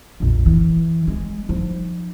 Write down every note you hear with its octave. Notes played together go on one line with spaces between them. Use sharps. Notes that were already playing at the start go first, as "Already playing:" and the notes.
A#1 F2
E3
G#3
F3 D#4